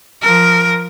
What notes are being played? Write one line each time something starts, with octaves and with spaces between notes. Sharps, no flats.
F3 A#4